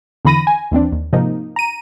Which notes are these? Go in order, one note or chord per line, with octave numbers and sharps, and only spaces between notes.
E2 D3 E3 B5 A#6 D#7
G#5
D#2 E3 C4 D4
D#2
G#2 C3 F3 A#3 D#4
A#5 D#7